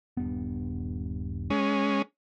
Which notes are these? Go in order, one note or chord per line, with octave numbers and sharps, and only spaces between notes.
D#1 G2 B3
G#3 C#4